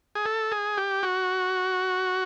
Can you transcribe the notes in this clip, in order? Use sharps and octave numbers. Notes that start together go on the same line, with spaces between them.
G#4
A4
G#4
G4
F#4